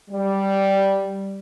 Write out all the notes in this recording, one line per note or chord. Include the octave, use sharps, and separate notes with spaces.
G3